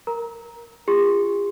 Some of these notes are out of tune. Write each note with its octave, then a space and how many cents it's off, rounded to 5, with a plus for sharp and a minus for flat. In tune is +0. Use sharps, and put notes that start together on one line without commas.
A#4 +0 A#5 +5
F4 -20 G#4 -45 C6 +0